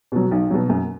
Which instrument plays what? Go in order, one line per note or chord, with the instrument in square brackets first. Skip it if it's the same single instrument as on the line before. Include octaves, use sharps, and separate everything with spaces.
[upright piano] B2 F#3
B1
B2 F#3
F#2